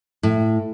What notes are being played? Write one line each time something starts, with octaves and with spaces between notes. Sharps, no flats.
A2